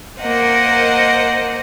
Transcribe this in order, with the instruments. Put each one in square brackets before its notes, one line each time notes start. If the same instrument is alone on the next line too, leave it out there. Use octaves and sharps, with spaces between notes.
[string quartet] A#3 A#4 C5 D#5 F#5